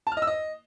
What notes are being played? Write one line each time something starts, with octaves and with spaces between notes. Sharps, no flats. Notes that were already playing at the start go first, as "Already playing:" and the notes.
A5
F6
D#5
E6
D#5